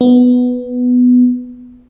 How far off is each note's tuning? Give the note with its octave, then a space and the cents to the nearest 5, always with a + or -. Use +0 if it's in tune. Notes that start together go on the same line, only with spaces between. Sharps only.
B3 +5